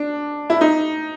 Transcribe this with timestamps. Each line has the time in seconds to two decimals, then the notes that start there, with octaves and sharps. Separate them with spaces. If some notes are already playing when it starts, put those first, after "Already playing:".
Already playing: D4
0.50 E4
0.61 D#4